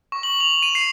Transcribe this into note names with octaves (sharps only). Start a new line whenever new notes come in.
C#6
F#7
F7
D#7
C7